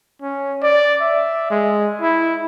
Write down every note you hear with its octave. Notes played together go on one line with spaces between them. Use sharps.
C#4
D5
E5
G#3
E4